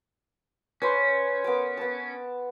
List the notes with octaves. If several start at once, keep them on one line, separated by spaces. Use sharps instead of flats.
C#4 B4 C5 C6
B3 A#4 D6
B3 A5